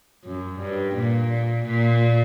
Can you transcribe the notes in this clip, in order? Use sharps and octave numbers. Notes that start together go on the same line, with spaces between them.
F#2
G2
A#2
A#2